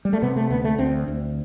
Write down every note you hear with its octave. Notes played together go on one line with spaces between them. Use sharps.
G3
A3
C3 B3
A3
D2 B3
A3
D2 C4
D2